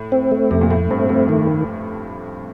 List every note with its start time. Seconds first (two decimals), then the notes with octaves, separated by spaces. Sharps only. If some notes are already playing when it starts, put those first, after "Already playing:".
Already playing: A2
0.12 C4
0.32 A3
0.51 F2 C3
0.61 A#2
0.71 A2 A3
0.91 G2 C4
1.09 F2 A3
1.29 D#3